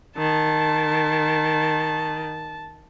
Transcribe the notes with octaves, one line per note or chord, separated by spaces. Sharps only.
D#3 A5